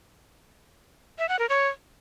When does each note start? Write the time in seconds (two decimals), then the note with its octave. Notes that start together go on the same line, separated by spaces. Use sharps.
1.19 E5
1.29 F#5
1.39 A#4
1.49 C#5